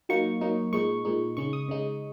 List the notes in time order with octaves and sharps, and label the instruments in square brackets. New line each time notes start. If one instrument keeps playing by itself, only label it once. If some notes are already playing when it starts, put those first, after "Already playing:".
[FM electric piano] F#3 A#3 D#4 C#6
F#3 A#3 D#4
A#2 G#3 D#4 C#6
A#2 G#3 D#4
C#3 G#3 D#4 C#6
D#6
C#3 G#3 D#4